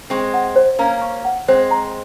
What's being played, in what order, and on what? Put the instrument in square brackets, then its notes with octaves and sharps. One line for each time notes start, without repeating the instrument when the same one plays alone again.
[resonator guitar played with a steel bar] G#3 C4 [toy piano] C#6
[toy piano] F#5
C5
[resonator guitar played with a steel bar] A#3 C#4 [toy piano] A#5
[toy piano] C#6
F#5
[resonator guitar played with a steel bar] G#3 C4 [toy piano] C5
[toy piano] A#5